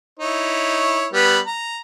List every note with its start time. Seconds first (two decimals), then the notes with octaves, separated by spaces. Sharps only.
0.19 D#4 E4 C#5
1.12 G3 B3 B4
1.47 A#5